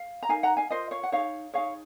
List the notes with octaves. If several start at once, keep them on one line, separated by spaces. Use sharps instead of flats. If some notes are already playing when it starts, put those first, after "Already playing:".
Already playing: F5
A#5
D#4 A#4 F5 G#5
F#5 A#5
F5 G#5
F4 A#4 C5 D#5
C#5 F5
F#5
D#4 G#4 C#5 F5
D#4 G#4 C#5 F5